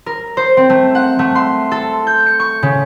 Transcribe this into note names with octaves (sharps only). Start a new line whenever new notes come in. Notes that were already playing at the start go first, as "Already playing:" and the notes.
A#4
C5
C4
A3
F#5
A3
C6
A4
G6
C#7
C#6
C#3